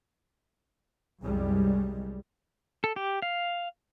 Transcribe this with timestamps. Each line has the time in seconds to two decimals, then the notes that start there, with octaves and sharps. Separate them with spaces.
1.22 C2 F#2 G3 G#3
2.84 A4
2.96 G4
3.22 F5